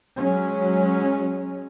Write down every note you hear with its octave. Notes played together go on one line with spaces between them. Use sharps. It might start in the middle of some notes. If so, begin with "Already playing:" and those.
F#3 G#3 C#4